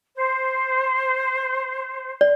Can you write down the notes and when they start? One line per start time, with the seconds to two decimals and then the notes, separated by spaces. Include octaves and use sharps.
0.15 C5
2.21 D5